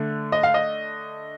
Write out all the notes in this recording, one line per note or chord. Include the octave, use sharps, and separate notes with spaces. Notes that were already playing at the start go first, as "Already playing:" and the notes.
Already playing: D3 A3
D#5
F5
D#5